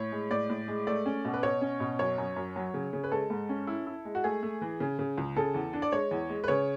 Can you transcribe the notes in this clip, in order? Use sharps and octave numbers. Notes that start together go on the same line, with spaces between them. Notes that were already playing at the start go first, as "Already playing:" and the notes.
Already playing: A2 C#5
G#3
A2 D5
A2
G#3
A3 D5
C#4
B2
B4
B2 C#5
C#4
B2
F#2 C#5
F#2
F#2
F#3
C#3
C#3
B4
G#3 A4
G#2
C#4
E4
E4
G#3
F#4
A3 G#4
A3
E3
C#3
C#3
C#2
C#3 A4
E2
D4
D5
G#3 C#5
E2
G#3
B4
C#3 C#5